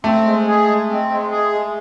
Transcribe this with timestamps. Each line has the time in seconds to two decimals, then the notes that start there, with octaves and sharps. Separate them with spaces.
0.04 A3 C4
0.25 G#3
0.47 G#4
0.67 G#3
0.89 C4
1.10 G#3
1.31 G#4
1.52 G#3